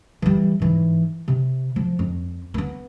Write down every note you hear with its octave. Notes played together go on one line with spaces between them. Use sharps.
E3 G3
G#2 E3
C3
F3
F2
A#3 B3